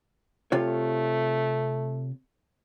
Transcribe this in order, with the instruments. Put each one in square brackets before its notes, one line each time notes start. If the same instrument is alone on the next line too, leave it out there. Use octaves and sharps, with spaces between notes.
[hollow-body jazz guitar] C3 F4 C#5 [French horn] A3